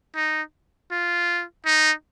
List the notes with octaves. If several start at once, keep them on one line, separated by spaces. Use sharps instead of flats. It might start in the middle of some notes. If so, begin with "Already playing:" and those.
D#4
F4
D#4